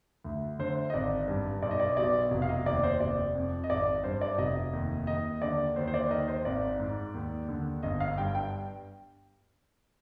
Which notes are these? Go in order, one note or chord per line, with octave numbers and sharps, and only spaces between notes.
D2
D3 C5
D#5
G#1 D5
G2
B1 D5
D#5
D5
B2 D5
F1
F5
D#5
D#2 D5
C5
F1 D5
F2
D#5
G#1 D5
G2 C5
D5
F1 D#5
D#2
D#2 D#5
D3 D5
D#2 C5
C5
D5
D#3 D#5
C5
G#1 D5
G#2
D#2
D3
G1 D#5
F5
G2 G5
G5